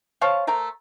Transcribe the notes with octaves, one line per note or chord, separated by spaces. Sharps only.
C5 C#5 F5 A5
A3 A#4 C5 A#5